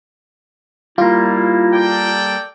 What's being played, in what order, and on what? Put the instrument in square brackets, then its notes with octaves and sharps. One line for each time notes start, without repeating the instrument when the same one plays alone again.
[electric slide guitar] G3 A#3 [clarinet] E4 [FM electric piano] F4
[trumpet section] A4 D5 G5